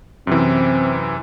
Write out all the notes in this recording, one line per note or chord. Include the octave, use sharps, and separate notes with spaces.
F#2 C3 E3 C4